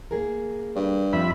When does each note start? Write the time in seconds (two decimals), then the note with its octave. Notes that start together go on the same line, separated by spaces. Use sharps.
0.11 A#3 G#4 A#4
0.75 G2
1.13 F2 E5 B5